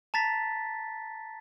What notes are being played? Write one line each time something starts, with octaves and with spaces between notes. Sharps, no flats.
A5 A#5 A6 B6